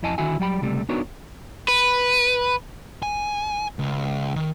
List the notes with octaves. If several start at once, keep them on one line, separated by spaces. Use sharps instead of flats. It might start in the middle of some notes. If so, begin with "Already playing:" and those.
F2 E4 D#5 G#5 A5
D3 D#3 E4 F#4 G#5
F#3 G3 G5 B5
C#2 C3 G3 A3
B3 D4 D#4 F#4 A#4 C#5
B4
G#5
C#2
D#3